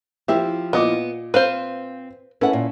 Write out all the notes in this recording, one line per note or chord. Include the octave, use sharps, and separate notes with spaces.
F3 C4 E4 G4 E5
A#2 B3 D#5 D6
C4 B4 C5 F5
C#4 E4 A4 B4 F#5
A#2